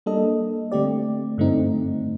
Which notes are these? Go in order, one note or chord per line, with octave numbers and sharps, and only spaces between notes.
G3 A#3 D4 A4 D#5
D3 A3 C4 G4 D5
G2 D3 A3 C4 D#4